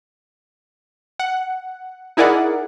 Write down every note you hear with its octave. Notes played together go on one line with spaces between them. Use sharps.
F#5
D#4 E4 G#4 A#4 D5 F#5